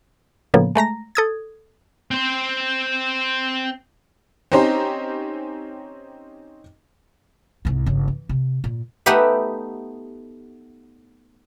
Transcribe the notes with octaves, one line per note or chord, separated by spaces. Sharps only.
A2 C#3 F3 A#3 B3
G#3 A3 A#5 A#6
A4 D#6 G#6
C4 C5
C4 C#4 D#4 G4 C5
C2 G#2
G1 C#3
E3
C3
A#2
A3 B3 D#4 G4 B4 E5